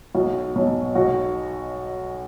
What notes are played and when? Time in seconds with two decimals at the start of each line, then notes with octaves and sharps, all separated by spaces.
0.15 B1 F#4
0.55 B2 F#3
0.95 B1 F#4